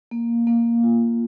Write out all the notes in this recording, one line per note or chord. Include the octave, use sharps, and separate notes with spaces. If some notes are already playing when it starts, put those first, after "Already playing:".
A#3
A#3
F4